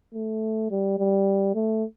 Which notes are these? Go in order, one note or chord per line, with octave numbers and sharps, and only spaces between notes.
A3
G3
G3
A3